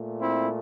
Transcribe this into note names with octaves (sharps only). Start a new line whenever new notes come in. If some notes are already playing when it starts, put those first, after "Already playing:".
Already playing: A#2 A3
C4 E4